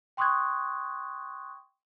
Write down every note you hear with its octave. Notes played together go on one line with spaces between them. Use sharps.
G5 C6 C#6 D#6 F#6 G#6